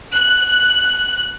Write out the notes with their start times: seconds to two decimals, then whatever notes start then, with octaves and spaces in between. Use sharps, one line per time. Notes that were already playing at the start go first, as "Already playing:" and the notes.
0.14 F#6